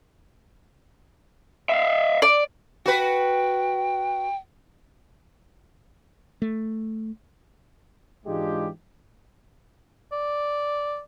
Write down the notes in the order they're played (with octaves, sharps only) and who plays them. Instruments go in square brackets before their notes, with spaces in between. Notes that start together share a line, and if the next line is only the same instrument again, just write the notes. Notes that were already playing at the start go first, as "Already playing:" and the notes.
[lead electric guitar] E5 F5
[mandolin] D5
[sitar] F#4 B4 [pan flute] G5
[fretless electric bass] A3
[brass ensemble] G#2 E3 G#3 D4 F4 G4
[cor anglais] D5